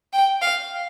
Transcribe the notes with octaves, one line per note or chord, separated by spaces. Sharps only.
G5
F5